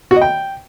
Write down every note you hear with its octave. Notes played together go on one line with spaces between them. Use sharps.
F#4
D#5
G5